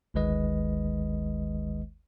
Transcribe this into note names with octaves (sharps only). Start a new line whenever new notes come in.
G1 D2 D#3 G#3 B4 D#5